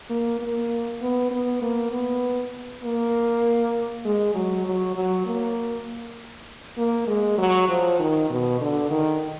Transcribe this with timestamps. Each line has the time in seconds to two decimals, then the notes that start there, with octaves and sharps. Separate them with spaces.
0.10 A#3
0.40 A#3
1.02 B3
1.31 B3
1.62 A#3
1.92 B3
2.84 A#3
4.05 G#3
4.35 F#3
4.66 F#3
4.96 F#3
5.26 A#3
6.77 A#3
7.08 G#3
7.38 F#3
7.69 F3
7.99 D#3
8.30 B2
8.61 D3
8.91 D#3